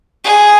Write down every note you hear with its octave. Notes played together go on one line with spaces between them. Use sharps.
G#4